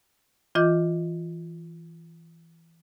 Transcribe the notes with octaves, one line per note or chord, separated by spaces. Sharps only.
E3 F4 D#5 D6 G6